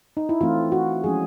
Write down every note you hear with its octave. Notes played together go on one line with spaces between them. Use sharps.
D#4
E4
E3 A3 C4 F4
F#4
F3 G#3 C#4 G#4